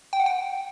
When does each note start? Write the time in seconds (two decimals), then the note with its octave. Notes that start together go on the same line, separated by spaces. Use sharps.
0.13 G5
0.20 F#5
0.26 G5